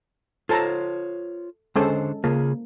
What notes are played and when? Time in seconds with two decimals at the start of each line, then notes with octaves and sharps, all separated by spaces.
0.49 F4 A4 C5 C#5 A5 A#5
1.76 D3 G#3 C#4 A4 C5
2.24 C#3 A#3 F4 G#4